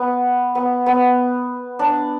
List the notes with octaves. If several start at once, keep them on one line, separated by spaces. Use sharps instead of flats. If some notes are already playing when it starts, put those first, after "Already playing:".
Already playing: B3
B3
B3
D4